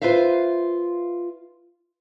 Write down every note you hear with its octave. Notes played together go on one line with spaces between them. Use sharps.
F4 B4 C5 E5 F5